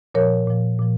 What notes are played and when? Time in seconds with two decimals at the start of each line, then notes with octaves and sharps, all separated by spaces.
0.14 A#2 F3 A#4 C#5
0.47 A#2 F3
0.79 A#2 F3